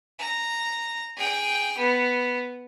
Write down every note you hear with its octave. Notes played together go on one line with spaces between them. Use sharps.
A#5
G#4 G5
B3